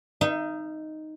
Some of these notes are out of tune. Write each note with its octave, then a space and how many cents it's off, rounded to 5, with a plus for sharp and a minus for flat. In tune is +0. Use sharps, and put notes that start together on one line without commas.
D#4 +0 E5 +40